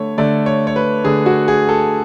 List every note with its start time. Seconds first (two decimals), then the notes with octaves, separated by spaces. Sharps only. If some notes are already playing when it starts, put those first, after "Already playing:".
Already playing: D3 A3 C#5
0.18 D3 A3 D5
0.46 C#5
0.67 C#5
0.76 B4
1.04 D3 A3 G#4
1.26 F#4
1.48 G#4
1.69 A4